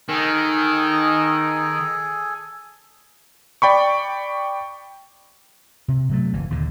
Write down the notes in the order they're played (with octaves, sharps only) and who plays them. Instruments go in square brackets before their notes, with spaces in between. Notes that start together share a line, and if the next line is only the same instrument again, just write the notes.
[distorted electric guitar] D#3 [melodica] G#4 A4 G#5
[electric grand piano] D5 G5 B5 C#6
[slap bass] C3
C3 F#3 A3
F#1 E3
D#2 A#2 D3